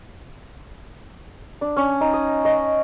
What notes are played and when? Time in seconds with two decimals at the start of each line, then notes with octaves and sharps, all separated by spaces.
1.61 D4
1.77 C#4
2.01 D#4
2.14 D#6
2.45 D#5